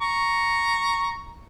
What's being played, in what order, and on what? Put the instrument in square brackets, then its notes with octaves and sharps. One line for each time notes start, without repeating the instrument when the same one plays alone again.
[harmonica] A#5 C#6